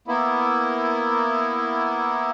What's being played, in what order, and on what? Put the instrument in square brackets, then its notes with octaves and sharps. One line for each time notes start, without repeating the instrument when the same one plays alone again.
[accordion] A#3 B3 E4